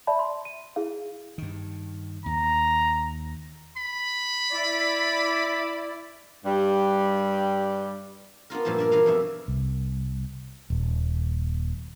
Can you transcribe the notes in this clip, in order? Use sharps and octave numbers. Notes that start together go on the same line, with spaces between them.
D5 E5 A5 B5
C6
D#7
E4 G#4 F5
G2 D#3
D#2 A#5
B5
E4 D5
G2 G3
B3 D4 F4 A#4
G2 A#2 F3 E4 A5
A#4 D5 E5
E3 D4 A#4 B4 F5
F2 B2 E5
C2
D#1